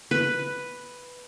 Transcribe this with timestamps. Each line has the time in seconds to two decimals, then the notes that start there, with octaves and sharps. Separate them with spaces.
0.11 B4